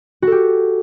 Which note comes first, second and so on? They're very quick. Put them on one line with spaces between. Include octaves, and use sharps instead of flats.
F#4 A4 G4